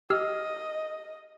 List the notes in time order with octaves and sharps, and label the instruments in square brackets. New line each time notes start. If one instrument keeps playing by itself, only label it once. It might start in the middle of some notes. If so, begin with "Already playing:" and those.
[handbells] G4 E6 F6 [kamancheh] D#5